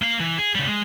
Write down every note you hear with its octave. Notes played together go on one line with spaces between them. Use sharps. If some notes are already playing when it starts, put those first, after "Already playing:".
A#3 F5
E3
G#4
C#3 G3
G#3